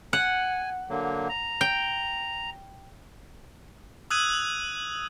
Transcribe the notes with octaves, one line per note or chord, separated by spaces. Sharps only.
F#5 G#5
D3 F#3 A#3
A#5
G5
D#6 E6 F#6 G#6 D#7 F#7